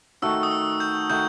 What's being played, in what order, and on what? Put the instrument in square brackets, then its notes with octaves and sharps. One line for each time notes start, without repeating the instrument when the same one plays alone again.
[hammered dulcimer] D#3 A3 D#4 F#4 [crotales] E6
[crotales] D#6
E6
G6
[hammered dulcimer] D#3 A3 D#4 F#4 [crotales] G6